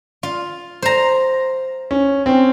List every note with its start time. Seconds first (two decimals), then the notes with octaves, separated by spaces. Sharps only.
0.23 F4
0.82 C5 A#5
1.91 C#4
2.26 C4 C#4